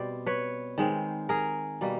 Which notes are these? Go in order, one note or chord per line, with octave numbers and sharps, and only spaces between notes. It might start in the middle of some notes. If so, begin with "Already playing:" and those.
Already playing: B2 G3 C4 C5 D5
B4 C#5
D#3 G#3 C4
G#4 A#4
B2 G3 A#3